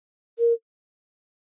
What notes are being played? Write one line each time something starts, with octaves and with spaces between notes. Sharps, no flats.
A#4